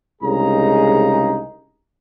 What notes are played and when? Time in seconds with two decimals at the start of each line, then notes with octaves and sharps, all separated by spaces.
0.21 C2 C#3 G#3 D#4 G#4 A#5